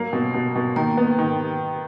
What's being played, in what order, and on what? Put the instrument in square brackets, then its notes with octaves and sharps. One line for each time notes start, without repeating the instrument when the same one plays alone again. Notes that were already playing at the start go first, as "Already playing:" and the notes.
Already playing: [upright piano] F#3 A#3
B2
B2
B2
[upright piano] D#3 [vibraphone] A#3
[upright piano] B3
D#3